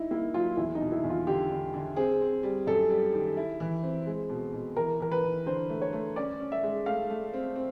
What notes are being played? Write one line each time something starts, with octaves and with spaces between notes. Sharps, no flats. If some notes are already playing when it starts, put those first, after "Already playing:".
Already playing: D#4 E4
A#3 E4
F#3 F4
E2 E4
D#4
B2
E4
E2
F4
D3 G4
D3
D3
C4 G#4
C4
G3
F#2 A4
G3
D#3
E4
E3
C4
G#3
B2
B2
E3 A#4
E3 A#4
B4
E3
D3 C5
A3
C#5
A3
C#4 D5
C#4
E5
G#3
A3 F5
A3
C4
C4